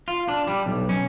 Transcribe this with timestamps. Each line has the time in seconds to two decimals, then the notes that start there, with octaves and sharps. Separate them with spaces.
0.08 F4
0.28 D4
0.48 G3
0.66 B1
0.89 C#4